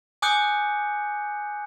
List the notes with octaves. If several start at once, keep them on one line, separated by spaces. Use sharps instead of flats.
G#5 D6 D#6 F#6 G6 C#7